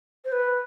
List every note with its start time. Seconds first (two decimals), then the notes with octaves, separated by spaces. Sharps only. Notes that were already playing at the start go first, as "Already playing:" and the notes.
0.25 C5
0.32 B4